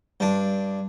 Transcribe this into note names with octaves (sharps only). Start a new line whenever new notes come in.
G2 D4